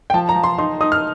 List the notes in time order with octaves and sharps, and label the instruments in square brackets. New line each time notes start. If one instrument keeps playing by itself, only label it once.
[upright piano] G5
[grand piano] F3 [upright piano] A5
[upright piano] A#5
[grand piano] F3
[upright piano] C6
[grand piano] D#4 [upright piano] C6
[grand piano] D#4 [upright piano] D#6
[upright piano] F6